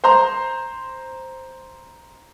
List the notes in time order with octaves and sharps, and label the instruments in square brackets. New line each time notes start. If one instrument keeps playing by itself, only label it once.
[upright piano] C5 A#5 C6